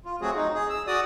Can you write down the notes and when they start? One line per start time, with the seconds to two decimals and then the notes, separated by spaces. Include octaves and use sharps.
0.05 F4
0.21 F#3 A3 C4 F#4 G#4
0.35 D#4
0.54 G#4
0.70 E6
0.87 F#4 D5 D#6